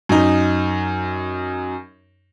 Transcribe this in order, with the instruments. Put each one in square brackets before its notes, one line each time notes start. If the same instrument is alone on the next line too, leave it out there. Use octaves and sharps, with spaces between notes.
[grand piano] F#2 D#4